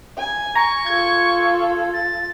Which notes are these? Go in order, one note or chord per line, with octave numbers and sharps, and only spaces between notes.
G#5
A#5 C#6
F4 A4 G#6
A6